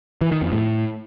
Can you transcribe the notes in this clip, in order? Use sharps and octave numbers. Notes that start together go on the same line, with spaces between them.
E3
D#3
F2
A2